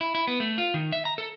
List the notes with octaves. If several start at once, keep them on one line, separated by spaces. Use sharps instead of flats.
E4
E4
B3
A3
F4
D#3
E5
A#5
A4